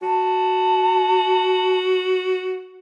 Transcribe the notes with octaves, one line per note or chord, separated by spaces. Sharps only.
F#4 A5